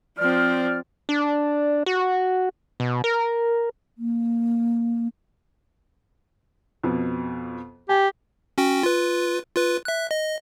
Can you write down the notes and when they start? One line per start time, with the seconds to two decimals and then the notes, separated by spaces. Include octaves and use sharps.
0.18 F3 C4 D5 F6
1.09 D4
1.86 F#4
2.80 B2
3.04 A#4
3.98 A#3
6.83 F2 B2
7.89 G4 G#5
8.58 C#4 F#4 G5
8.83 F4 B4
9.56 F4 B4
9.85 E5 F#6
10.11 D#5